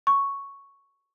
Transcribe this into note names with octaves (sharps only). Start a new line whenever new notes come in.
C#6